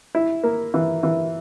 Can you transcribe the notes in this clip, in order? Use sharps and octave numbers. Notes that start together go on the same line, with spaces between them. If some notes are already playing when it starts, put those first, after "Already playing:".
E4
A#3
E3
E3